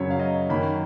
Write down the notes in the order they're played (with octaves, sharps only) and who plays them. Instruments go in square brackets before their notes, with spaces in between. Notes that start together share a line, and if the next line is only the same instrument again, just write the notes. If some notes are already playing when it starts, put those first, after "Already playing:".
Already playing: [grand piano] F#2 C#3 F#3 C#5
F5
D#5
F#2 D#3 A#3 C#4 B5